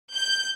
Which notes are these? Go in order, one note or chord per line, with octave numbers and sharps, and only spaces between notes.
G6